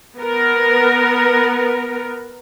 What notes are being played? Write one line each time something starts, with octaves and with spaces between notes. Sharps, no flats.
B3 A#4